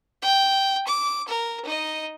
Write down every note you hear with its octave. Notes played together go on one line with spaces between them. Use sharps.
G5
D6
A#4
D#4 D#5